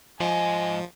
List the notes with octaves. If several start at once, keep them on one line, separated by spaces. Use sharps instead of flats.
G#2 F3 D#5 G#5